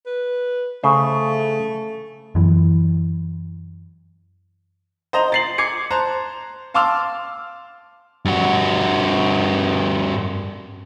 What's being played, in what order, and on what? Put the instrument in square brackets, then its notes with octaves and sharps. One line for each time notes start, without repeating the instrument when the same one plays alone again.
[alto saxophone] B4
[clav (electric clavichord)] C#3 C5 [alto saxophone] A3
[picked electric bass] F#2 E3
[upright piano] C5 D#5 A#5
A6 C7 F#7
D6 G#6 C7 C#7
C5 A5 A#5 F#6
F5 A5 C6 D6 E6 F6
[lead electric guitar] G2 F#4